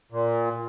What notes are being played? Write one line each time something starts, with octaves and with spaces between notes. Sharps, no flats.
A#2